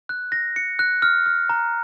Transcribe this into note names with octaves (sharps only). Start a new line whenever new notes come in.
F#6
A#6
C#7
F#6
F6
F6
A#5